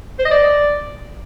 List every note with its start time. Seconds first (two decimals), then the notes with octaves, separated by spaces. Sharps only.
0.19 C5
0.25 D#5
0.31 D5